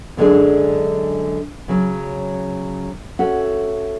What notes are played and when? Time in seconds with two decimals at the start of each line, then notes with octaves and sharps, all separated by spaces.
0.17 F#2 D3 G#3 D4 G#4
1.68 C#3 F#3 C#4
3.19 A3 C#4 F#4